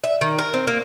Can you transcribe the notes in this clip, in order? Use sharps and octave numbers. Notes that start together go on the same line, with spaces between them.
E5
D#3
A#4
C4
A#3